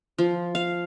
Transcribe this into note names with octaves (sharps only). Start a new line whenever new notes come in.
F3
F5